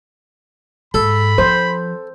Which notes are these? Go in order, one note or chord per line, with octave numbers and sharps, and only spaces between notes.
G#2 A4 B5
F3 C5